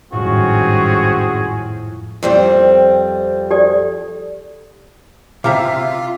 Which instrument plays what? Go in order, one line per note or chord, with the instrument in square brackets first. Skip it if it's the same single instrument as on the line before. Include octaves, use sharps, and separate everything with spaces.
[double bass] G#1 G3 [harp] F2 A2 [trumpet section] C4 C#4 G#4 [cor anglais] F#4
[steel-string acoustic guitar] F2 G3 C4
[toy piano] G4 A4 D5
[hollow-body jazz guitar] C3 A#5 [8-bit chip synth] F4 [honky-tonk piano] E5 F5 [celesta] D6 F6